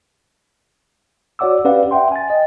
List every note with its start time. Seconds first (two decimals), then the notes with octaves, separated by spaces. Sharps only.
1.39 F#4 C#5 D5 F#5 D6 E6
1.65 C#4 G4 B4 D5 F5 F#5
1.91 E5 F#5 G5 C6
2.12 G#5 A6
2.30 D#5 G5